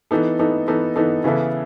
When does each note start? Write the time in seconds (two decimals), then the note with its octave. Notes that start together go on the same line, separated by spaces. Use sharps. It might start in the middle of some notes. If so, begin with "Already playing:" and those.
0.11 E3 B3 D#4 A4
0.39 E3 B3 D#4 A4
0.68 E3 B3 D#4 A4
0.96 E3 B3 D#4 A4
1.24 C#3 E3 B3 E4 A4